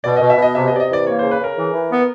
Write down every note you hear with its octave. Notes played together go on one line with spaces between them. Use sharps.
B2 D5
D#5
B2
E5
B2 D#5
C3 E5
D#5
C3 D5
D#5
E3 D5
A#3 C#5
C#3 C5
B4
C#3 A#4
E3
E3
B3